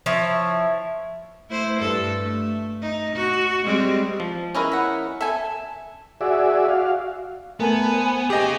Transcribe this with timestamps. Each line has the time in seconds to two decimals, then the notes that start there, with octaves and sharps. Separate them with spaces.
0.06 F3 E4 C#5
1.50 A3 E4 C5
1.79 G2 A4
2.23 A3
2.82 D#4
3.15 F#4
3.65 G3 G#3 C4
4.20 F3
4.55 C#4 E4 G#4 A#4 B4 D#5
4.72 E5 F#5
5.21 A4 E5 G#5
6.21 F#4 G#4 D5 E5
6.68 F#4 F5
7.60 A3 B3 A#4 G#5 A5
7.94 C5
8.30 G4 G#4 D#5 F5 G#5